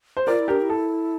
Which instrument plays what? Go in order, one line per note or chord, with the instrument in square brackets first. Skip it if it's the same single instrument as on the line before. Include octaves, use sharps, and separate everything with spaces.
[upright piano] C5
[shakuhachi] F4 [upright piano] A#4 D5
[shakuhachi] E4
[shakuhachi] D4 [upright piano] G4 A#4
[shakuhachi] E4
[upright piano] A4